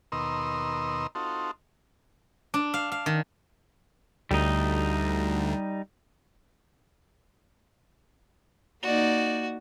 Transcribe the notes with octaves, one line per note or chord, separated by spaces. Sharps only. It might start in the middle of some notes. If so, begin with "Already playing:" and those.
D#2 B2 A#4 D#5 C6 E6
C4 D#4 F4 F#4 A4
D4
F5
F5
D#3
D2 G3 D#4
A#3 D#4 F#4 D5